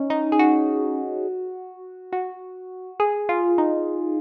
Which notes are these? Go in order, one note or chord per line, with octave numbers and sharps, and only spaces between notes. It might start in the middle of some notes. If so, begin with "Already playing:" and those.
Already playing: C#4 D#4
D#4
G#4
F#4
F#4
G#4
F4
D#4